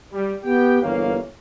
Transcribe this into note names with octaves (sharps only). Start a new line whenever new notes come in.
G3
B3 G4 G5
G1 D#2 E3 A#3 C#5 F5